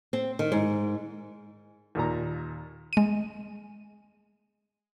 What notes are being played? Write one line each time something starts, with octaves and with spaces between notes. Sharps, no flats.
C4
D#3
G#2
D#2 A#2 A#5
G#3 D#7